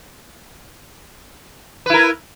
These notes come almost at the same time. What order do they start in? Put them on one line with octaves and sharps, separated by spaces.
B4 E4 A#4